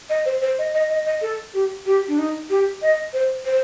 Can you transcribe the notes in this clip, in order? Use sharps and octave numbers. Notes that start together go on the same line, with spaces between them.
D#5
C5
C5
D#5
D#5
D#5
D#5
A4
G4
G4
D4
D#4
G4
D#5
C5
C5